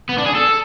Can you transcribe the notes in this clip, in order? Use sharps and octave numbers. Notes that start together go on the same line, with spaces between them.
B3
D4
G#4
A4